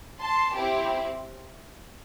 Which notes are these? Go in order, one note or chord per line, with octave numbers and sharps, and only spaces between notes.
A5 C6
C4 E4 G4